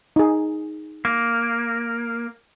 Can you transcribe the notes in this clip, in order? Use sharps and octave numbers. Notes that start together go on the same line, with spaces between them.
D#4 G#4
A#3